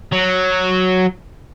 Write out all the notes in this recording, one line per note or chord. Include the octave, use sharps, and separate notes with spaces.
F#3